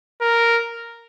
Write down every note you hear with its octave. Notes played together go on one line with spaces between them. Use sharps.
A#4